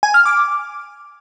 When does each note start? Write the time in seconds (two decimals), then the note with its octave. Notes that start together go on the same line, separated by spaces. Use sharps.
0.03 G#5
0.14 F6
0.25 D6